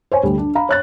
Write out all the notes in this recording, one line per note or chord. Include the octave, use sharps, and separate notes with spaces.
C5 C#5 G#5
D2 G3
D4
F5 A#5 B5
C#5 F#6 A6